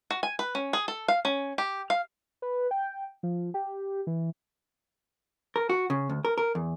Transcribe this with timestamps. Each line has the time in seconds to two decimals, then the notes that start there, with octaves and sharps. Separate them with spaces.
0.11 F#4
0.23 G#5
0.39 B4
0.55 C#4
0.73 G#4
0.88 A4
1.08 F5
1.25 C#4
1.58 G4
1.90 F5
2.42 B4
2.71 G5
3.23 F3
3.54 G4
4.07 E3
5.56 A#4
5.70 F#4
5.90 C#3
6.10 D2
6.25 A#4
6.38 A#4
6.55 E2